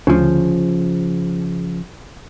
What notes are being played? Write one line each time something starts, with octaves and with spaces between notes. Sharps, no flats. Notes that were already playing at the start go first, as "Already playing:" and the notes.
D2 C#3 F3